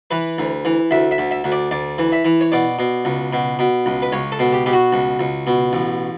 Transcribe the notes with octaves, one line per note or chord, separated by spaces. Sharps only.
E3 B4
D2
E3
D2 E5
E5
D2
E5
D2
D5
D2 D5
E3
E5
E3
C#5
B2 D5
B2
C#2
B2
B2
C#2
B4
C#2 C#5
A4
B2
G4
B2 G4
F#4
C#2
C#2
B2
A1